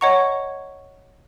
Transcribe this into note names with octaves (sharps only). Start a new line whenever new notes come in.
C#5 D#5 F#5 A#5 C#6